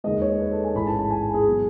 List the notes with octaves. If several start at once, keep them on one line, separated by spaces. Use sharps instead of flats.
D#2 D#3 G#3 D#5
C#5
B4
A4
G#5
A1 G#2 E3 G#3 B5
A5
A5
G#5
G#4
B2 F#3